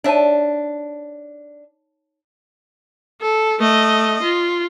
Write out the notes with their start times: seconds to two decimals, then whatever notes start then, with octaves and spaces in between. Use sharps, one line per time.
0.04 D4 D#4 C#5 E5 A5
3.22 A4
3.60 A3 D#5
4.23 F4